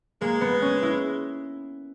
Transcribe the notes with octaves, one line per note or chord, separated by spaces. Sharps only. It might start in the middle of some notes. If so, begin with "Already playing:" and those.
G#3 A#3
B3
C#4
E4